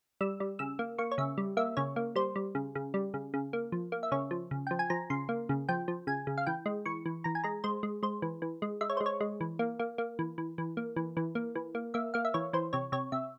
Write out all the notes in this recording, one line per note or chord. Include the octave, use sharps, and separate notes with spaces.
G3 E6
G3
C#3 E6
A#3
A#3 C#6
C#5
C#3 E5
G3
A#3 E5
C#3 C#5
A#3
G3 C5
G3
C#3
C#3
G3
C#3
C#3
A#3
F3
A#3
E5
C#3 C#5
F3
C#3
F3 G5
G#5
F3 A#5
C#3 C6
A#3
C#3
F3 G5
F3
C#3 G#5
C#3
F5
E3 G5
G#3
E3 C#6
E3
E3 A#5
G#5
G#3 A#5
G#3 C5
G#3
G#3 C5
E3
E3
G#3
G#3 E5
C#5
C5
G#3
C#5
G#3
E3
A#3
A#3
A#3
E3
E3
E3
A#3
E3
E3
A#3
E3
A#3
A#3 E5
A#3 F5
E5
E3 C#5
E3 C5
C3 C#5
C3 C#5
C3 E5